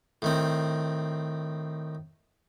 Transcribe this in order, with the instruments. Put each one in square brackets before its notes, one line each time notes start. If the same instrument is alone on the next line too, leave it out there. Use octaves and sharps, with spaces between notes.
[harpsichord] A2 D#3 C4